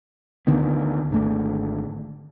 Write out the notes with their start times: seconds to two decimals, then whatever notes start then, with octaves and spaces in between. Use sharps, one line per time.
0.47 D2 D3 D#3 B3
1.11 G#1 D3 A3